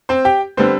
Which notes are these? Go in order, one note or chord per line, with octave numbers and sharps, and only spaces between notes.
C4 C5
G4 G5
D3 G3 B3 C4 C5